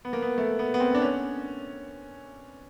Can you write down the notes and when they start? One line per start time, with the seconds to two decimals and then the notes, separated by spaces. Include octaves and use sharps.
0.05 B3
0.13 A#3
0.22 B3
0.38 A3
0.59 B3
0.74 B3
0.80 C4
0.95 D4
1.02 C#4